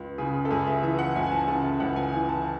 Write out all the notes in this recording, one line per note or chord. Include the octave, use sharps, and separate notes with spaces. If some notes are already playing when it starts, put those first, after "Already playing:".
Already playing: C#2
C#3 G#4
A4
C#2 G#4
E5
E3 E5
F#5
C#2 G#5
G#5
A5
C#3 A5
C#2 F#5
G#5
E3 G#5
A5